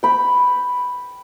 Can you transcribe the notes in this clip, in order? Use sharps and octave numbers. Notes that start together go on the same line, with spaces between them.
G5 B5